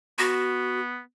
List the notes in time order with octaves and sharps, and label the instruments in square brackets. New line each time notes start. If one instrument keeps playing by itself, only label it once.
[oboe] B3 [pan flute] F#4